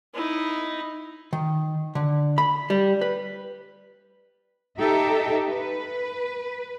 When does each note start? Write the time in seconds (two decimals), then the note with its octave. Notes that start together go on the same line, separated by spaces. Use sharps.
0.14 D#4 E4
1.33 D#3
1.95 D3
2.38 B5
2.70 G3
3.01 B4
4.80 D#4 G4 A4 E5
5.49 B4